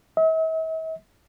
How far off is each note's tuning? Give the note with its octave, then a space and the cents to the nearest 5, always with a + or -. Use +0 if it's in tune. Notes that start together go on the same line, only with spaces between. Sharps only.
E5 -45